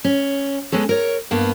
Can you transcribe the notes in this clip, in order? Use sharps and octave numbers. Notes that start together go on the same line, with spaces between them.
C#4
G#3 B3 C#4 A4
A#4 C#5
G2 A#3 B3 A5